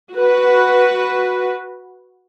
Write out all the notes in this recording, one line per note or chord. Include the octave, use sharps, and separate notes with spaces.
F#4 B4